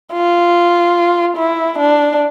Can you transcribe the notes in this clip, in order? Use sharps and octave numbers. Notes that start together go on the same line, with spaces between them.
F4
E4
D4